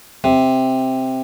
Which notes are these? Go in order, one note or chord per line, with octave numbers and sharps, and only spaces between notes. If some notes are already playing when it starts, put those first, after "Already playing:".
C3